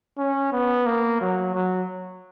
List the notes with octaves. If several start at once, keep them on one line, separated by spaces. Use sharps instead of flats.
C#4
B3
A#3
F#3
F#3